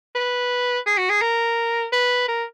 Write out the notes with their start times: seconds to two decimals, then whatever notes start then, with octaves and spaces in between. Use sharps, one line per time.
0.15 B4
0.86 G#4
0.98 F#4
1.10 G#4
1.22 A#4
1.92 B4
2.28 A#4